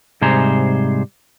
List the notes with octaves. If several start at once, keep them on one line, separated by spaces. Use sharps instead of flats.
G#2 C3 G3 G#4 C5 A#5